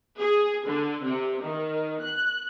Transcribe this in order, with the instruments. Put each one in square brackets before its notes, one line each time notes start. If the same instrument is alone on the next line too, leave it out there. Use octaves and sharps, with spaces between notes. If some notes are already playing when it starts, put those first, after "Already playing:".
[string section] G#4
D3
C3
D#3
F#6